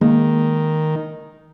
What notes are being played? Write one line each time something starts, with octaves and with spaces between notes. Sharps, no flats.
D#3 G#3 A#3